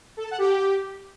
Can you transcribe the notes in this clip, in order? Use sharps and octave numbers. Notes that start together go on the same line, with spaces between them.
A4
A5
F#5
G4